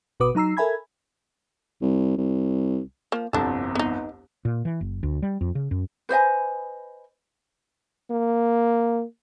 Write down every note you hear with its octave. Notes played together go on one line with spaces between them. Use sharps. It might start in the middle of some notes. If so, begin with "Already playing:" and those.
G#1 B2 F#4 B4 D6 D#6
F#3 D#4 A#5 E6 C7
A4 A#4 E5 G#5 B5 G#6
C2
C2
F3 A#3
G1 C2 F2 D4 A4
B3 D#4
A#2
E3
F#1
D2
G3
F2
C#3
F#2
B4 C5 D#5 G#5
A#3